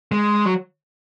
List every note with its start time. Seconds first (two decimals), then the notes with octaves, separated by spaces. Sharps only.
0.12 G#3
0.45 F#3